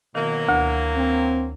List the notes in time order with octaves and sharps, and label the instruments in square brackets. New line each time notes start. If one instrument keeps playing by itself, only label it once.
[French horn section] B2 [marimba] D#3 [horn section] E3 F#3 A#3
[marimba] D2
[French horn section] C4